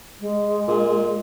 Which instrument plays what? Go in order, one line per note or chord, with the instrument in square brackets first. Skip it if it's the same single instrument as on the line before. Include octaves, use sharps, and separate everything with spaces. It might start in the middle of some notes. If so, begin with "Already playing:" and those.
[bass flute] G#3
[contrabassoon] A#2